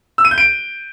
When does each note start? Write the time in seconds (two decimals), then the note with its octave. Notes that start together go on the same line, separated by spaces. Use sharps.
0.18 E6
0.25 D#7
0.31 G6
0.38 D7